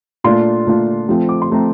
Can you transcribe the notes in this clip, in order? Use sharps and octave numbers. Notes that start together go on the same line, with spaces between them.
A#2 A3 D4 F4 C6
A#2 A3 D4 F4
F3 A3 C4
D6
C6
F3 A3 C4 A#5